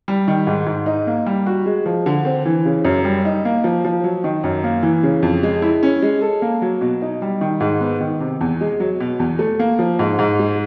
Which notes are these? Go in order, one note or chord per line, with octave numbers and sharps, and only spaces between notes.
G3
D#3
G#2
G#2
D#4
A#3
G3
F#4
G#3
F3
D3
C4
E3
C#3
F#2
G3
D#4
A#3
F3
F3
F#3
D#3
F#2
A#3
E3
C#3
F2
G#3
E4
C#4
G#3
A4
A#3
F#3
B2
D#4
G3
D#3
G#2
B3
D#3
C3
E2
G#3
F#3
B2
E2
A3
A#3
F3
G#2
G#2
G#3